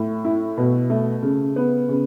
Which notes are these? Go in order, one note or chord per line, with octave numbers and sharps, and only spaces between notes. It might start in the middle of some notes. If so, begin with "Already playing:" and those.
Already playing: A2
E4
B2
A3
C#3
B3
C#3